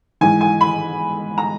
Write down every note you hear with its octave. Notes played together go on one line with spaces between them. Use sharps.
G#2 E3 G#5
G#5
B5
A#5